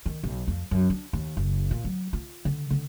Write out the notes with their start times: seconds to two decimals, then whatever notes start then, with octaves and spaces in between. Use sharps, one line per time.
0.06 D#3
0.24 B1
0.47 F2
0.71 F#2
0.90 D4
1.13 D#2
1.37 F#1
1.71 A#2
1.84 F#3
2.13 F4
2.45 D3
2.70 D3